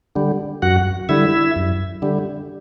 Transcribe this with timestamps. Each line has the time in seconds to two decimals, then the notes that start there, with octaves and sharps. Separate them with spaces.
0.16 D3 G3
0.62 F#2 F#4 F#5
1.09 D3 G3 E4 E5
1.56 F#2
2.02 D3 G3